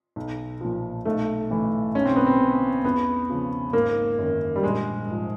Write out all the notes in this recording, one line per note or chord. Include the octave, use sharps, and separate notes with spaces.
B1
A#2 F3
B1 A3
A2 E3
B1 C#4
C4
B3
C4
B2
E2 B3
C#3 F3
G#1 A#3
F#2 D#3
G3
A#1 G#3
G#2 F3